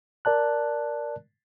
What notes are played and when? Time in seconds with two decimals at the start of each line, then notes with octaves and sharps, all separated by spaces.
0.25 A#4 D5 A5 F#6